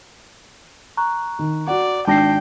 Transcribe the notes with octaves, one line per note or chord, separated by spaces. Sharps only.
A#5 C#6 F#6
D#3
F#4 D5 F#5
G#1 D4 G5 A5 D6 A#6 C7